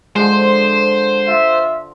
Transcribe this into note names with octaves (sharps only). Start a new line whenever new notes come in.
D3 F3 G#3 C5
F4 E5